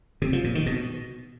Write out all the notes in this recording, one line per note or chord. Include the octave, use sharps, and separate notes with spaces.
C3
F3
A#2
D#3
B2